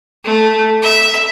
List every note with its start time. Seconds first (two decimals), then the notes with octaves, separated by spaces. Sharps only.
0.24 A3
0.82 E5